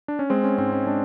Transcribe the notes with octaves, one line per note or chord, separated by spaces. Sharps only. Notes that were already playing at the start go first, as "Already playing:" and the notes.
D4
C#4
G#3 C4
C#4
G#2 C4
C#4
G#3 D4